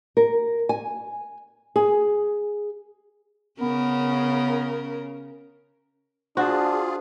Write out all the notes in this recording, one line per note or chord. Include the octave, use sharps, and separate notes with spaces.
A#4
G#5
G#4
C#3 B3 C#4 A#4
D4 F4 F#4 G#4 C5 A5